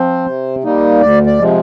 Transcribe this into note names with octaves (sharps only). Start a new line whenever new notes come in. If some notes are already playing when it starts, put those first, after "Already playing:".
Already playing: F3 C4 C5
C3
G3 A#3 D#4
D2 D5
D5
C3 F3 G#3